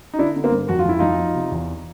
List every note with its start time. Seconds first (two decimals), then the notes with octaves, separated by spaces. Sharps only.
0.14 D#4
0.19 D3 D4 E4
0.36 D3
0.44 A#3 C4
0.52 G2
0.68 F2 F#4
0.79 F4
0.85 F2 E4
0.99 F2 D#4 F4
1.18 F3
1.35 C3
1.52 E2